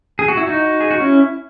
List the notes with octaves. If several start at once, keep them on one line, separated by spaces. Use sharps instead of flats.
G#4
F#4
E4
D#4 F#4
G#4
F#4
C#4 E4